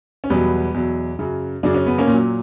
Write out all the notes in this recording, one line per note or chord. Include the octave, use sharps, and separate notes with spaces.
C#4
E2 B2 F#3 G3 B3
E2 B2 F#3
F#2 C#3 F#3
F#2 C#3 F#3 D4
C#4
B3
A#3 C#4
A#2 F#3